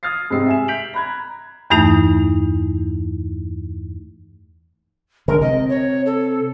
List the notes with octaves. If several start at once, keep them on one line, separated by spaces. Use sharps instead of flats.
D#6 F6 G#6 A6 C7
G#2 C3 G3 C4 E6 C7
E5 G#5 E7
G6 B6 D7 F7 F#7
A#5 B5 F#6 G#6
E2 G2 E3 A3 D#4
D3 G#3 A#4
C3 D#5
C#5
A4